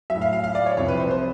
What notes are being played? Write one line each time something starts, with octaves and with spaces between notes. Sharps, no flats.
A2 F#3 E5
F5
F5
F5
D5
C#5
C2 C3 F3 C#5
B4
C5
C5